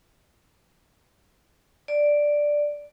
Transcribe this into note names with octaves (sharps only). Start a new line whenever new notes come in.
D5